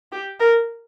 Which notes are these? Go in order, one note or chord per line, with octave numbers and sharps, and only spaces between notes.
G4
A#4